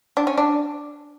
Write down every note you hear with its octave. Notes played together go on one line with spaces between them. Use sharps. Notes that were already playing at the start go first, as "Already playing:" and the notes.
D4
C#4
D4